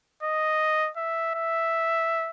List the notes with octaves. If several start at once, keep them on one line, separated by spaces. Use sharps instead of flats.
D#5
E5
E5